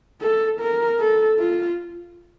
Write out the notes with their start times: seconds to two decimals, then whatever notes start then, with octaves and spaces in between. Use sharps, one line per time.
0.21 A4
0.60 A#4
0.99 A4
1.39 F4